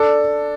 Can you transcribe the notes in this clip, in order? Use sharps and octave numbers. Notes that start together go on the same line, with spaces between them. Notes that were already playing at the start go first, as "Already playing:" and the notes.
Already playing: D4 A4